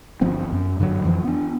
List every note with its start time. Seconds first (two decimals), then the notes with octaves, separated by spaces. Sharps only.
0.21 G1 F3 B3 C4
0.52 F#2
0.80 G2 D3 F3 F#3
1.04 F2 E3 F3
1.25 B3 D4